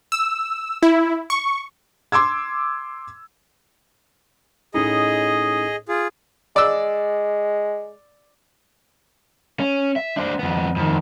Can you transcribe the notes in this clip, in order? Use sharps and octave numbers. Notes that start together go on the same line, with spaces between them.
E6
E4
C#6
C6 D6 E6 G#6
A2 C#4 D#4 G#4 D#5
F4 G#4
G#3 D5 E6
C#4
E5
D4 C5
F2 B3
F2 D#3